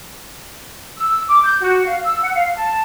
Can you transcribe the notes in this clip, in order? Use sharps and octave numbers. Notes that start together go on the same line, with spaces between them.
E6
D6
G6
F#4
F5
E6
F#5
F5
A5